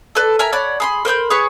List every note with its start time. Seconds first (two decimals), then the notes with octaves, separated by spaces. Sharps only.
0.15 A4 B4 D5
0.39 A#4 E5 G#5 A#5
0.52 C#5 D5 F#5 B5
0.80 G#4 B5 C6
1.05 A#4 C5 B5 G6
1.30 G#4 B4 C#5 C#6